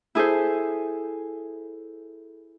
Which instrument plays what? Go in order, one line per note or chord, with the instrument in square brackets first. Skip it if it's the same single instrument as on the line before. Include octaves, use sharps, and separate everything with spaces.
[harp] E4 G#4 A4 C5